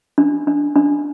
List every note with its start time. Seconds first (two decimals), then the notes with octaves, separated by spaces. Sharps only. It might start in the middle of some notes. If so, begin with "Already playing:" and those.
0.18 D4
0.47 D4
0.76 D4